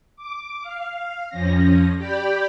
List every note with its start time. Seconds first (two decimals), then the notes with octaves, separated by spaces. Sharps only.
0.16 D6
0.62 F5
1.29 F2 F3 C#4 A#6
1.97 G4 D5 G5 B5 G6